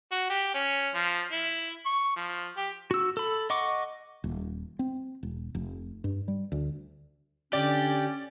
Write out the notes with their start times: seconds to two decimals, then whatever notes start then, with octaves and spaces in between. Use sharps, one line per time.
0.12 F#4
0.30 G4
0.54 C#4
0.95 F3
1.32 E4
1.86 C#6
2.16 F3
2.57 G4
2.91 F#4 E6
3.17 A4 B5
3.50 D#5 F#5 C#6 D6
4.24 D#1
4.79 C4
5.23 E1
5.55 F1
6.04 G2
6.28 G3
6.52 D2
7.53 D3 C#4 G4 D5